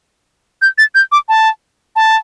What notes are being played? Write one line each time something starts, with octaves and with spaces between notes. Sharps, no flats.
G6
A6
G6
D6
A5
A5